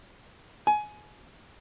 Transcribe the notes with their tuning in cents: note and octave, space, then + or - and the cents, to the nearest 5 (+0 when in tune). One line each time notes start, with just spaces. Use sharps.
G#5 +20